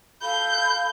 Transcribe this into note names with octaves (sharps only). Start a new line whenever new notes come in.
A4 F5 B5 G6